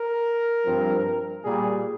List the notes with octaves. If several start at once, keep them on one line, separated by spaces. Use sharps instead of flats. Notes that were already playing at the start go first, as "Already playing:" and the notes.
Already playing: A#4
G2 F3 C4
A#2 G3 A#3 G#4